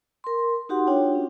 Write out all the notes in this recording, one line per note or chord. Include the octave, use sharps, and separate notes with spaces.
A#4 C6
D#4 F#4 G4 F#5 C6
D4 F4 F#4 C#5 G5
C#4